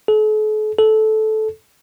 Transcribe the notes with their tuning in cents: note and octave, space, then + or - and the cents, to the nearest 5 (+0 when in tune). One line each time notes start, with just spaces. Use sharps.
A4 -45
A4 -15